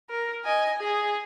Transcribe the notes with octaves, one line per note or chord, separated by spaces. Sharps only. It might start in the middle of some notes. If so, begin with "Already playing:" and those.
A#4
D#5 G#5
G#4